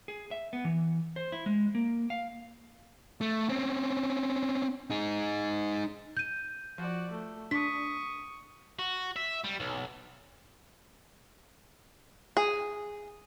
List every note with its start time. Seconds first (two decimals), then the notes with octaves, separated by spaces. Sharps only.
0.08 G#4
0.31 E5
0.53 B3
0.65 E3
1.16 C5
1.32 E4
1.46 G#3
1.75 A#3
2.10 F5
3.21 A3
3.49 C4 C#4
4.90 D#4 G#4
6.17 G6 D#7
6.78 F3 F#4 D5
7.11 A3
7.51 D4 C#6 D#6 B6
8.79 F#4
9.16 E5
9.44 G3
9.60 B1
12.37 G#4